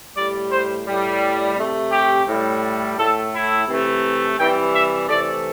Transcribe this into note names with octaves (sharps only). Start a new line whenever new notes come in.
A2 G3 D5
C5
A2 G3
C3 A3
G4
A2 G3
A2 A3 A4
E4
C3 E3 A3
C3 E3 G3 G5
E5
C3 E3 A3 D5